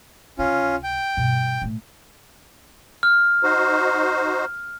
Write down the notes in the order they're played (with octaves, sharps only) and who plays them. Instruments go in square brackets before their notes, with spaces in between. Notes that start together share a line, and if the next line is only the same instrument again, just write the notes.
[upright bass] C#2 C3 [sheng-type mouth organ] C#4 F4
[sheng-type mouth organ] G5
[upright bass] G2 B2
A2 A3
[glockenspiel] F6
[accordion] D#4 F#4 C5